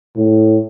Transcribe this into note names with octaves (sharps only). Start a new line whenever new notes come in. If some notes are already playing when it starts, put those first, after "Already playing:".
A2